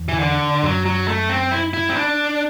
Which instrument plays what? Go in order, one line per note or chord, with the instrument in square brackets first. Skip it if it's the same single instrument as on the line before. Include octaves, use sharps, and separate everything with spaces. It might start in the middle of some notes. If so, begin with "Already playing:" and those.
Already playing: [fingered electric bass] E2
[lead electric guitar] E3
D3
[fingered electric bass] F#2 [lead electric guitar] F#3
[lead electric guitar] F#3
A3
C4
E4
E4
C4
D4